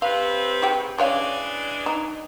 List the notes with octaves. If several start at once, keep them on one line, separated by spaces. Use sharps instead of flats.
C3 C4 B4 F5
G4 G#4 G5
C#3 E3 G#3 D4 C#5 F5
D#4